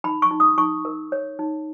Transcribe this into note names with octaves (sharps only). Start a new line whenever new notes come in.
D#4 B5
C#6
D#4
D#6
D#4 C#6
A#4
C#5
D#4